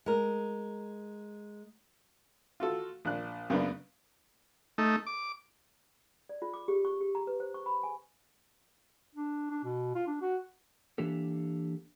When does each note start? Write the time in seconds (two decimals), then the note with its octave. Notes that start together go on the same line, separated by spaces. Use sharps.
0.06 G#3 A#4
2.60 F4 F#4 A4
3.05 A#1 D4 F#6
3.50 F#2 C#3 A#3 B3 D4 F#6
4.78 A3 D#4
5.06 D6
6.29 D5
6.42 F4
6.54 D6
6.68 G4
6.85 C#6
7.01 G4
7.15 A#5
7.27 B4
7.40 C5
7.54 C#6
7.66 B5
7.83 G#5
9.15 D4
9.50 D4
9.64 B2
9.95 F4
10.07 D4
10.21 F#4
10.98 E3 A#3 D4 G4 A4